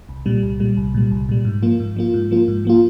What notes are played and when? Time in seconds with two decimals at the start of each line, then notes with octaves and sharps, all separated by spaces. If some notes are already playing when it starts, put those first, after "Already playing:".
0.09 C2
0.26 A#2 G3
0.43 C2
0.60 A#2 G3
0.77 C2
0.94 A#2 G3
1.11 C2
1.29 A#2 G3
1.45 G#2
1.62 F3 A#3 F4
1.80 G#2
1.96 F3 A#3 F4
2.14 G#2
2.31 F3 A#3 F4
2.48 G#2
2.65 F3 A#3 F4